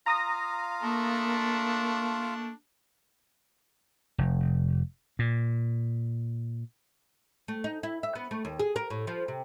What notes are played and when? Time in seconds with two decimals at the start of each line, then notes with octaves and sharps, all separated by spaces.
0.06 F4 F5 A#5 D#6 A#6
0.83 A3 A#3 D4
4.18 F1
5.19 A#2
7.48 A3
7.64 D#4
7.83 E4
8.03 E5
8.15 B3
8.31 A3
8.45 D#2
8.59 G#4
8.76 A#4
8.90 A2
9.07 F3
9.28 C3